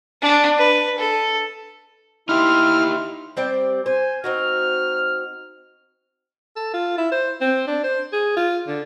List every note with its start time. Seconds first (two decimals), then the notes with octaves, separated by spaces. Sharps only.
0.22 D4
0.59 B4
0.98 A4
2.29 D#4 E4 G4 C6 F6
3.37 G3 C4 D5
3.86 C5 G#5
4.24 C4 D#4 F#4 F6
6.56 A4
6.74 F4
6.98 E4
7.12 C5
7.41 C4
7.67 D4
7.84 C5
8.13 G#4
8.37 F4
8.68 D3